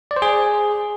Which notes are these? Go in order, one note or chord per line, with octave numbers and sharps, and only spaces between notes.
D5
C5
G#4